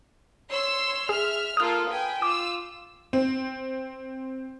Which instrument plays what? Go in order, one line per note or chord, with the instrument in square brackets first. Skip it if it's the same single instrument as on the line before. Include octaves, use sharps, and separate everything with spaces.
[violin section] C#5 C6 E6
[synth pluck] G#4 [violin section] E5 F6
[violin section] A#3 F4 A4 [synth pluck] D#6 F6
[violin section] B4 G5 G#5
[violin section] F4 E6 [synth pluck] D6
[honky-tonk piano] C4